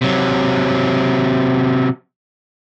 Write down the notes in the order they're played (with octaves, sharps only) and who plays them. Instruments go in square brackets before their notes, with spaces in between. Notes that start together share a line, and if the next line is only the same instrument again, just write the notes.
[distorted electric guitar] C3 F#3